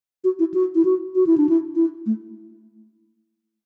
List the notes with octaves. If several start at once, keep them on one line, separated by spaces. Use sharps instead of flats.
F#4
E4
F#4
E4
F#4
F#4
E4
D4
E4
E4
A3